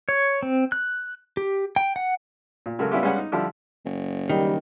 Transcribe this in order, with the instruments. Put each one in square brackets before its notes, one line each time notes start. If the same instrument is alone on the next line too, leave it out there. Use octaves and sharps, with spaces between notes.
[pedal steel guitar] C#5
C4
F#6
G4
G5
F#5
[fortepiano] A#2
C#3 F#3 G#3 A3 F#4 A#4
G3 B3 C#4 E4 F4 G4
G3 G#3 B3 C#4 F5 F#5
D#4
D3 F3 G3 E4 G4
[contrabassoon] F#1
[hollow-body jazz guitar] D#3 [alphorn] G3